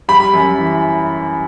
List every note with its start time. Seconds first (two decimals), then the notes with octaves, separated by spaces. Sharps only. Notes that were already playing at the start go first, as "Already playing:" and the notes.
0.08 G3 B5
0.34 F#2
0.58 E3